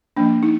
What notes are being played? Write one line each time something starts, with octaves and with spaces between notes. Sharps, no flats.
F3 A#3 D4
D#4